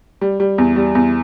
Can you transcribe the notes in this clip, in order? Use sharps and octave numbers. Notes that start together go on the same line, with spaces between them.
G3
G3
E2
G3
E2